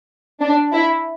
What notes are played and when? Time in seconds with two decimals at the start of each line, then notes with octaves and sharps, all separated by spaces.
0.41 D4
0.72 E4